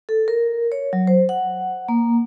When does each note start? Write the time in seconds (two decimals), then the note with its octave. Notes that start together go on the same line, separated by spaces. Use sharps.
0.09 A4
0.28 A#4
0.72 C#5
0.93 F#3
1.07 C5
1.29 F#5
1.89 A#3